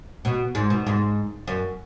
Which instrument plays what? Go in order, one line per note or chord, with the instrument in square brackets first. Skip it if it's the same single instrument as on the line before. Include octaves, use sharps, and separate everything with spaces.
[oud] B2
G#2
B2
G#2
F#2